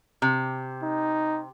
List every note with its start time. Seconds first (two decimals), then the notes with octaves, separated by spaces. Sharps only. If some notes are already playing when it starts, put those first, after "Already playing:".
0.22 C3
0.83 D#4